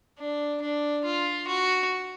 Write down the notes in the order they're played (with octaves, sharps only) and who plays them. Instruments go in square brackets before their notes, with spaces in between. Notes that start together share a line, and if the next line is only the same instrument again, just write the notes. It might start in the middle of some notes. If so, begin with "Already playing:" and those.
[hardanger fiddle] D4
D4
F4
F#4